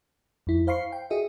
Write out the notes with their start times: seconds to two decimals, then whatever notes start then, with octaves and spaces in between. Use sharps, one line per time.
0.47 F2 E4
0.67 C5 F5 B5 C#6 C7
0.92 G5
1.10 F#4 G#4 D#5 E5